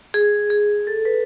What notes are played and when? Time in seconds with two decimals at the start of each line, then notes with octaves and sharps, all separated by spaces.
0.14 G#4
0.50 G#4
0.87 A4
1.05 B4